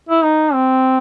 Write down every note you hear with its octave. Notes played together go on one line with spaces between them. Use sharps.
E4
D#4
C4